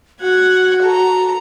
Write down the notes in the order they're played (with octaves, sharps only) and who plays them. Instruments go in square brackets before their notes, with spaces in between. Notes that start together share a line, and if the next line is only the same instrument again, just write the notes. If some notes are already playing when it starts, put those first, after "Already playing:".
[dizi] F#4 [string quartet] F#5 G#6
[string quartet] A4 A#5